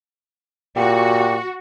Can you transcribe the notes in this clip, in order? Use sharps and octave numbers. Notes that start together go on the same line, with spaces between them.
A#2 F#4 G4